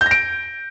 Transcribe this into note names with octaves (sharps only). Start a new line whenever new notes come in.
G6
A#6
D7